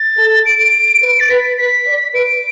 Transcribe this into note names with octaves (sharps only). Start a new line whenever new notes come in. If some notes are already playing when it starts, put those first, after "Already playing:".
Already playing: A6
A4
D7
D7
B4
A6
B4 B6
B4 B6
D5
B4 D7